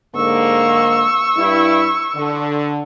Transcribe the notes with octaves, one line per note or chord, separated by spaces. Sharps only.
G#2 D3 A#3 C#6 E6
G2 E4
D3